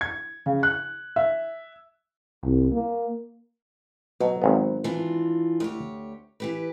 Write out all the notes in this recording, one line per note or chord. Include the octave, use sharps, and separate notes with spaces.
G#6
C#3
F#6
E5
C2
A#3
B2 F#3
G#1 B3
E3 D4 F4
D2 G4 C#5
E3 G4 B4